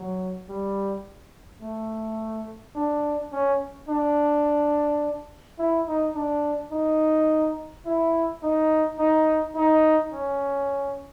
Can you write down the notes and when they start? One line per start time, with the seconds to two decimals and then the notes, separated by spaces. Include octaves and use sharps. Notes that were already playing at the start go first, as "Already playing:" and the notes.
Already playing: F#3
0.49 G3
1.62 A3
2.76 D4
3.33 C#4
3.89 D4
5.59 E4
5.88 D#4
6.15 D4
6.72 D#4
7.86 E4
8.43 D#4
8.99 D#4
9.56 D#4
10.13 C#4